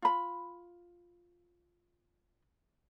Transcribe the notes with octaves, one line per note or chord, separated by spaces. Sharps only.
F4 B5